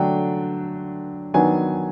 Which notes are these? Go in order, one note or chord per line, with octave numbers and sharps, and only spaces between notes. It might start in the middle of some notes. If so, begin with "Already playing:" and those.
Already playing: D3 F#3 A3 D4 G5
D#3 F#3 B3 D4 G#5